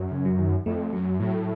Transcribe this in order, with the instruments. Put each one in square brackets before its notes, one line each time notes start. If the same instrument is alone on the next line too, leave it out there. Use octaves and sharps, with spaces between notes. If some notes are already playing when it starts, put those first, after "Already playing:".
Already playing: [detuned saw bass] F#2
[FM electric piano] C#3
F#3
D#3
[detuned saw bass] F2 [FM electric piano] A3
[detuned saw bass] F#2 [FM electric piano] F#3
[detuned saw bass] A2 [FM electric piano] F#3